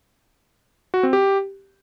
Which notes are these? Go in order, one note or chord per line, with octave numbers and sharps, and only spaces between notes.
F#4
C4
G4